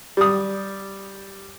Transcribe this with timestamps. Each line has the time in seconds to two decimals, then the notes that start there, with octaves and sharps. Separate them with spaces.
0.17 G3 D#6